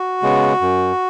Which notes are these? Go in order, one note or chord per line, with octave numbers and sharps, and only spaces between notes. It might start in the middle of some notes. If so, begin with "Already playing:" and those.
Already playing: F#4
C#3 G#3 B3
F#2